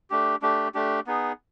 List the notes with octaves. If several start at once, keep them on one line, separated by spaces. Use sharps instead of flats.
A3 D4 G4
A3 D4 G4
A3 D4 G4
B3 D#4 G#4